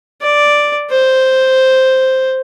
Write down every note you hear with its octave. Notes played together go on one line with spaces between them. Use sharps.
D5
C5